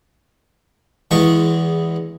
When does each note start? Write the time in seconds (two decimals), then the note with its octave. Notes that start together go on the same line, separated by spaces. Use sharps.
1.11 E2 E3 G#3 C#6